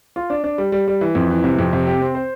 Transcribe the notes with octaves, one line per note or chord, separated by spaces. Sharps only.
F4
D4
D4
G3
G3
G3
E3
F2
E3
C3
F2
C3
G4
C4
C5